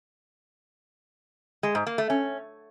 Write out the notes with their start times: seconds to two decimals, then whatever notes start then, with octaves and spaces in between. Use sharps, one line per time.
1.63 G#3
1.75 G#2
1.87 A#3
1.98 A3
2.10 C#4